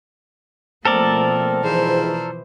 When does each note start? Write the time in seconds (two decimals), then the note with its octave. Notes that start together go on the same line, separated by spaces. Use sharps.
0.85 B2 F3 A3 A#3 C4 A4 A#4 D5
1.64 G#2 B2 E3 F3 E4 C5